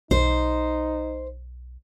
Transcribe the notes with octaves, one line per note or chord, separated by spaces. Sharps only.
B1 D#4 C5